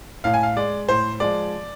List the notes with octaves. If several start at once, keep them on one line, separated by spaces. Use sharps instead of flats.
A2 F5
G#5
F5
G#3 D5
A2 C5
F3 G#3 D5